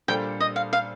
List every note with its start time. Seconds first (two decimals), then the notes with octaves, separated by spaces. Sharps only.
0.08 A#2 G3 D4 A4 C5 G5
0.40 D#5
0.56 F5
0.73 F5